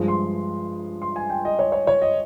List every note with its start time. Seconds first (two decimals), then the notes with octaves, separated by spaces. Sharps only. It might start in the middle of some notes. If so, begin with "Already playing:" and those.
Already playing: G2 F3 G#3
0.08 C6
1.02 C6
1.16 G#5
1.30 G5
1.45 D#5
1.59 C#5
1.72 C#5
1.87 C#5
2.02 D#5